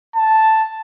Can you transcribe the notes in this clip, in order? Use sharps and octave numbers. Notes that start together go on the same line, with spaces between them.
A5